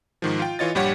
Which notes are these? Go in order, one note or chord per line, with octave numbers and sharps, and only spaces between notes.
G#2 D#3 F3
F4 G5
E3 F4 C#5 D#5 A6
A#1 G2 G3 G4 C#5 F#5